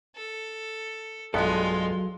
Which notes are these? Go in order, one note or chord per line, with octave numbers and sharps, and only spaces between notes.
A4
B1 G2 F#3 G#3 B3 F4 A4